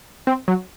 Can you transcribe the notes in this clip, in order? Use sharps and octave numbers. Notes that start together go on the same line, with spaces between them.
C4
F#3